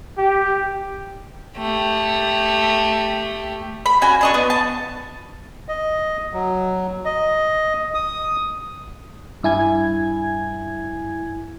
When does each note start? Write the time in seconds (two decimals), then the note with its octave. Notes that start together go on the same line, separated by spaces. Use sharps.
0.17 G4
1.59 A3 G4
3.86 B5
4.02 C#4 F#4 G#5
4.21 D4 D#5 C#6
4.34 B3
4.50 A5
5.68 D#5
6.33 F#3
7.05 D#5
7.94 D#6
9.43 G2 E4 G#5 G#6